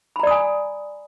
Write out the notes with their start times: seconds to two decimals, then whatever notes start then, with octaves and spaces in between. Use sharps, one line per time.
0.16 B5
0.20 A#5
0.23 D5
0.27 D#6
0.31 G#5